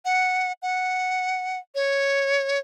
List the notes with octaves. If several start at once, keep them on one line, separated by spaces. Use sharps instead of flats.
F#5
F#5
C#5